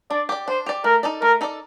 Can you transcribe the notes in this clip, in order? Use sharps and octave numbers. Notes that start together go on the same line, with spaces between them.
D4 D5
G4 D5
D4 C5
G4 D5
A3 A#4
D#4 A4 D5
A3 A#4
D#4 A4 D5